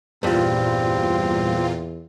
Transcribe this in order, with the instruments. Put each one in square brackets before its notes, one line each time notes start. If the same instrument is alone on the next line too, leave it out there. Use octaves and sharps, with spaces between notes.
[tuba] E2 [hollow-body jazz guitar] G2 G3 [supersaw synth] A#2 F4 [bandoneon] C4